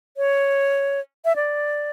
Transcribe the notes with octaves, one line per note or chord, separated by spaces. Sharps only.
C#5
E5
D5